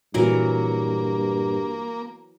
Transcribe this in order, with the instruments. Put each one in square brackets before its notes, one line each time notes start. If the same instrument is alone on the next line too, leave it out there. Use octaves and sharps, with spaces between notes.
[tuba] G2 [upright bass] A#2 [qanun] E3 F#3 A#4 [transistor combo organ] A#3